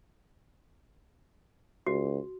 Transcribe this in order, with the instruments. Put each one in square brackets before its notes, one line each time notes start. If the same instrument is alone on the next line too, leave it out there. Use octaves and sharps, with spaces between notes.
[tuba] C#2 [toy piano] F#4